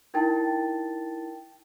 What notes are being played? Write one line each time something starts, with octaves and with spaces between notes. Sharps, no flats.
D#4 E4 A#4 G5 A5 A6